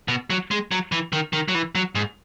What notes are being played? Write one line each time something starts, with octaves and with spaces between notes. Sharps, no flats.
B2
F#3
G#3
F#3
E3
D#3
D#3
F#3
E3
F#3
G#2